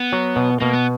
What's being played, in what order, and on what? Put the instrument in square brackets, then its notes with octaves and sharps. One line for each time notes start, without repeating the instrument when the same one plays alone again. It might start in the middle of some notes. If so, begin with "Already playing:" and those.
Already playing: [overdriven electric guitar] B3
[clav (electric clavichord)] F#3
B2
[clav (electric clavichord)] B2 [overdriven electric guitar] A#3
[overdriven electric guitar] B3